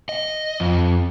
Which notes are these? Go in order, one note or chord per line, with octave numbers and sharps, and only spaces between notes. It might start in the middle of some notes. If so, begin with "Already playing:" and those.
D#5
F2